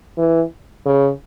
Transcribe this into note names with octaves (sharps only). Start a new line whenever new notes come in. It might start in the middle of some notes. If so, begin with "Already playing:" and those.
E3
C#3